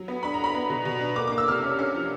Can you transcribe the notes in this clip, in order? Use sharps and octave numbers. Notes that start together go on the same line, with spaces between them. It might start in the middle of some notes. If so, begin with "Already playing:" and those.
Already playing: F#3
B3
D4 B5
A#5
D4
B5
B3
B2
B2
D4
A#3 D6
D6
A#3
E6
C3 F6
C#4
C#4 F6
F3